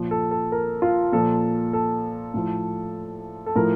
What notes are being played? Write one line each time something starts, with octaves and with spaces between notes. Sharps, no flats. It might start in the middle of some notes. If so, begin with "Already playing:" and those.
Already playing: A#2 F3
A4
A4
A#4
F4
A#2 F3 A4
A4
A2 F3
A4
A2 F3 A#4